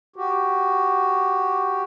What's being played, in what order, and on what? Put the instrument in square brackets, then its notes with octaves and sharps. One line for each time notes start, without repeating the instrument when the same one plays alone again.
[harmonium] F#4 G4